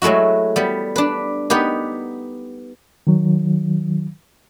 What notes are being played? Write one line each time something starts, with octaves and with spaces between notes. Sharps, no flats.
F#3 G#3 A3 E4 F#4
G3 B3
D4 B4
B3 D#4 G4 B4
D#3 F#3